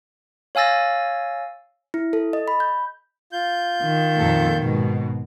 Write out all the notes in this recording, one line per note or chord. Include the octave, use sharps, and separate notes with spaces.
C#5 F5 G#5 E6 A6 A#6
E4
A4
D#5
B5
G6
F4 G6
D#3
F2 A#2 A4
G#2 B2